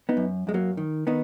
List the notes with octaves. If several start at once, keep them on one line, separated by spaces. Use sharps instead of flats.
B3 D#4
F#2
F#2 G#3
F#3 A#3
D#3
D#3 B3 D#4